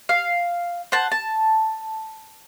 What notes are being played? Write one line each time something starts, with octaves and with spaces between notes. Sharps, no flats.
F5
C5 F#5 A5
A5